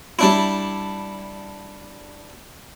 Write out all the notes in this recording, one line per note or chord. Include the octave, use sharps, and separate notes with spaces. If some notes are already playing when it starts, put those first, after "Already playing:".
G3 D4 E4